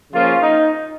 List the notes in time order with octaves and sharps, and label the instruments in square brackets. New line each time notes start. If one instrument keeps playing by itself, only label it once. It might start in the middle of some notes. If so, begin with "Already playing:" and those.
[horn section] C#3 F3 A#3 C#4 F4
D#4